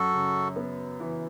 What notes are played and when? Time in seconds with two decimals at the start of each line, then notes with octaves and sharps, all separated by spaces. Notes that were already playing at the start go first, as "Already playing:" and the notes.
Already playing: F#2 F#4 A4
0.14 C#3
0.56 B3
1.00 E3